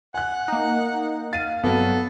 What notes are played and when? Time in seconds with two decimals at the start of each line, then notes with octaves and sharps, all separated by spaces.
0.14 F#5 G#5 F#6
0.48 A#3 D#4
1.33 F5 A6 D#7
1.64 G2 F#3 B3 A4